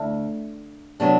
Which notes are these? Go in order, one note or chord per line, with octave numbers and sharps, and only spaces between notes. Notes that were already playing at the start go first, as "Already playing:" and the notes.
Already playing: D2
C3 F#3 B3 D4